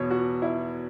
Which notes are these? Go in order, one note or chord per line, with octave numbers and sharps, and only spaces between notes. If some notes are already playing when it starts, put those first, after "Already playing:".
Already playing: E2 B2 C#5
F#4
E4